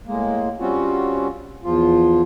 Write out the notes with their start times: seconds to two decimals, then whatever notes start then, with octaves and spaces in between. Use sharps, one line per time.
0.07 A2 G#3 A#3
0.60 G3 C4 C#4 F4 F#4
1.64 E2 F3 F4